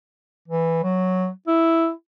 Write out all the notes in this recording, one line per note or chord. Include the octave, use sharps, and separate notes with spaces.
E3
F#3
E4